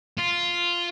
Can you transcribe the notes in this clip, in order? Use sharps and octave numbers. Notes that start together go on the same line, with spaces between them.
F4